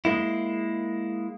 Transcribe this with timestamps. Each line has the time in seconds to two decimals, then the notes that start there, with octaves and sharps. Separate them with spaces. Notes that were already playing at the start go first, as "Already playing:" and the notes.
0.05 G#3 A#3 E4